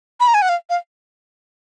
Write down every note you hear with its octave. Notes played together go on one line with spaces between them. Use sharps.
B5
A#5
G#5
F#5
F5
F5